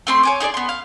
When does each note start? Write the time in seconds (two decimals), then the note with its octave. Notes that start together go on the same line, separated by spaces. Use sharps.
0.07 A3 C4 C6
0.23 C#5 G#5 D6
0.40 D#4 G#4 C5 D5
0.54 B3 C6
0.69 F5